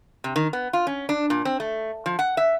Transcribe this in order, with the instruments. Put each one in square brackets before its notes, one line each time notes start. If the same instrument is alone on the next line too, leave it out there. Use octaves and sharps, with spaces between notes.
[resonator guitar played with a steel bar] C3
D#3
B3
F4
C#4
D4
A#2
C4
A3
F3
F#5
E5